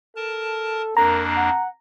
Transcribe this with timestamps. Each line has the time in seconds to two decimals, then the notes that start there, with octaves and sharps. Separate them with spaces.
0.16 A4 A#4 A5
0.97 F2 A#3 D4 A#4 A#5
1.37 F#5